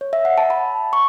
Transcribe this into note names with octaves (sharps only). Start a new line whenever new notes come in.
C#5
E5
F#5
A5
B5
C#6